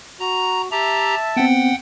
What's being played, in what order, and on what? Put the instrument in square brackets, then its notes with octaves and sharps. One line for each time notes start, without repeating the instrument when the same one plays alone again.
[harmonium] F#4 [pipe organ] A#5
[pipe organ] G4 A#5 [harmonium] E5 A5
[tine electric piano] B3 C4 [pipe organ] F#5 G5